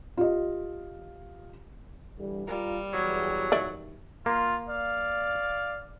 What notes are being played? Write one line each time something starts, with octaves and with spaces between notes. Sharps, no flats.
F4 G4 D#5
D3 E3 G3
G3 F4 A#4
E2 F#3
D#3 D5 E5
A#3 F4
D5 F5